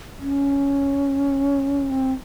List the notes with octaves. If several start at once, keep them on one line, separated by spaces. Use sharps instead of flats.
C#4
C4